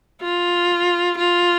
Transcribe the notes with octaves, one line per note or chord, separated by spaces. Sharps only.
F4
F4